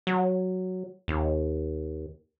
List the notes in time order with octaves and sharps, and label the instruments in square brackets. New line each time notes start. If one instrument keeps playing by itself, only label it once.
[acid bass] F#3
D#2